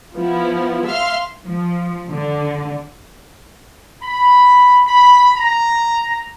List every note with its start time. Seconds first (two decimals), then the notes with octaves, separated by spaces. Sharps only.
0.15 F3 B3 E4
0.86 E5 F5 C6 F6
1.46 F3
2.09 D3
4.02 B5
4.86 B5
5.36 A#5